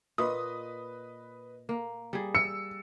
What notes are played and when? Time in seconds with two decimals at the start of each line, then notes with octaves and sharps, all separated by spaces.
0.18 A#2 B4 D#5 D#6
1.69 A#3
2.13 G3 G#4
2.35 E6 C#7